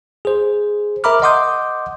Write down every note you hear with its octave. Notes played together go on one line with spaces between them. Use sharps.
G#4 C5
A#4 E5 A#5 B5 D6 F6
D#5 F#5 C6 D6 D#6 G6